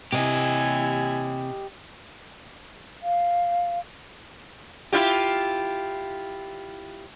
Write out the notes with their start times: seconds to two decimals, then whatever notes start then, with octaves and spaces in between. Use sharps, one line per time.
0.12 C3 E4 G4 D#5 G#5
3.03 F5
4.93 E4 F4 G4